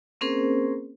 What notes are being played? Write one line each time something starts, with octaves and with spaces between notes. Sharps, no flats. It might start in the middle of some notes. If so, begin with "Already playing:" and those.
A#3 C4 C#4 G#4 A#4 C5